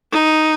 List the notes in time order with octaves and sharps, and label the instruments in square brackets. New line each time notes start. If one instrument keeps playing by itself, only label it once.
[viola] D#4